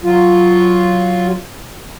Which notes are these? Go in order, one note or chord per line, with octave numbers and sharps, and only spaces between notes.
F#3 F4